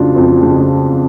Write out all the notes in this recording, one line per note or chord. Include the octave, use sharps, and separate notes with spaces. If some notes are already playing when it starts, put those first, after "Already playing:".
Already playing: F2 C#3 D4 F4 F#4
F2
C#3